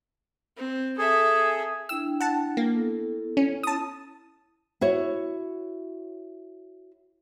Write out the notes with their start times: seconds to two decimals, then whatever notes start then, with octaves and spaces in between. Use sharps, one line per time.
0.57 C4
0.98 G#4 A4 E5
1.89 D4 E4 G5 E6
2.21 F#5 A5
2.57 A#3
2.73 B3 E4 A4
3.37 C#4
3.63 E4 A5 D#6
4.81 E4 F#4 C#5